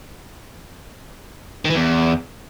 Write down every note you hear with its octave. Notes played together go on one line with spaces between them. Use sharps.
D#3
E3
E2